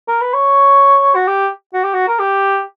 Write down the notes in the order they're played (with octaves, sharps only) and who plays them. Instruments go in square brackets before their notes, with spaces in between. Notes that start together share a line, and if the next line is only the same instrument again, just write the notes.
[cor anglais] A#4
B4
C#5
F#4
G4
F#4
G4
F#4
A#4
G4